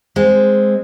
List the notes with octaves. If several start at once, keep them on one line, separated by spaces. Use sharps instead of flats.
G#3 C4